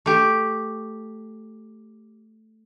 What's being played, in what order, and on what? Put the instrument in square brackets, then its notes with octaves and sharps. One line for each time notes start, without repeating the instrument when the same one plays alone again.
[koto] A3 G4